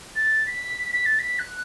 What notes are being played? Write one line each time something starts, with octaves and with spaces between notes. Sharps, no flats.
A6
B6
B6
A6
B6
F#6